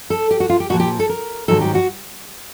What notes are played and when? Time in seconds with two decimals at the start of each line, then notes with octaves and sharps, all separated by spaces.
0.10 A4
0.31 G4
0.40 F#4
0.50 F4
0.60 G4
0.70 A#2 F3 A#3 F#4
0.80 G4
0.99 A4
1.09 A#4
1.48 G#2 D#3 F#3 A4
1.61 G4
1.75 F#4